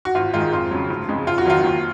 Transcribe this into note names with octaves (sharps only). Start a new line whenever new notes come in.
F#4
G#1 F4
G#2 D#3 G#3 F4
F2 F4
C#3 F#3
F1
F2 C#3 G#3
F2 F4
F#4
D#3 F#3 F4
D#2